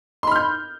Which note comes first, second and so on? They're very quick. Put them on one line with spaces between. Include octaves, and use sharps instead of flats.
C6 B5 F6 G6